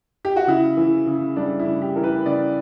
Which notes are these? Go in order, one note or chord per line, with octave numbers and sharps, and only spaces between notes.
G4
F#4
C#3 E4
E3
C#3
G3 D4
E4
C#3
G4
E3 A#4
B4
C#3 D5